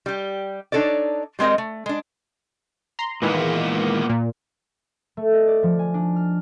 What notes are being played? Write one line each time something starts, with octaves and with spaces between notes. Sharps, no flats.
G3 G4
D4 D#4 A4 C#5 D5
G3 G#3 C4 A#4 D#5
A3
G#3 D4
A#5 C6
A#2 D#3 E3 G#3 A#3 B3
A#2
A3
D#5
D5
F3
G#5
D4
F6